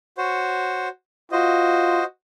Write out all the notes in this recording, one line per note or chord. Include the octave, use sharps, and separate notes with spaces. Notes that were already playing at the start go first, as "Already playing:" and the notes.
F#4 C5 C#5
F4 F#4 C5 D#5